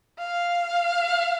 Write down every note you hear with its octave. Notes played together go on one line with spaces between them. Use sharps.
F5